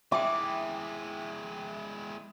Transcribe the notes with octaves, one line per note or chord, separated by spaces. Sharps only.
G#3 E4 E5 G5 D6